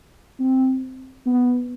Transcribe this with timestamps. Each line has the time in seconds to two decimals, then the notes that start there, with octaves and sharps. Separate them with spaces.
0.39 C4
1.26 B3